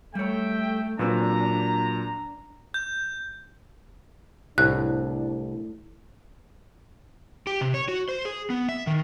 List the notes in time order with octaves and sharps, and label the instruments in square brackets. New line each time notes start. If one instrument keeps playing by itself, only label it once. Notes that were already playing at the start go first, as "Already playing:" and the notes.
[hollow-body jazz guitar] G3 C#5 [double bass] A3 [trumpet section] E5 G5
[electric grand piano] A#2 B4 E6 [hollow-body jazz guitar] F#3 G#3 C4 [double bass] D4 [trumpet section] A#5
[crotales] G6
[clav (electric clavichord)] C2 [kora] A2 [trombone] D4 [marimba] F#6
[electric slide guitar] G4
C3
C#5
F#4
C5
G#4
B3
E5
D#3